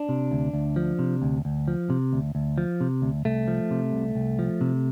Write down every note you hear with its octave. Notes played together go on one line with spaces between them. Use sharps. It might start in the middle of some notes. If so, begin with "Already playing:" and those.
Already playing: D4
C3
D2
D2
F3
C3
D2
D2
F3
C3
D2
D2
F3
C3
D2
C2 A3
F3
C3
C2
C2
F3
C3